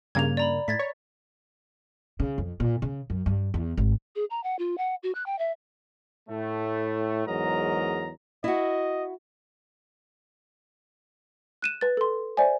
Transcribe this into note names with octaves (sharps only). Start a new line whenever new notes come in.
G2 C#3 A#3 G#6 F7
D5 A#5 B5
A2 G#6 A6 B6
C#5
C#3
F2
A#2
C#3
F#2
G2
E2
G#1
G#4
A#5
F#5
F4
F#5
F#4
F#6
G5
E5
A2 A3
E2 G#2 F#3 A#4 D#5 A#5
E4 F#4 D#5
F#6 D#7 E7
B4 A6
A4 C6
C5 D5 E5 G#5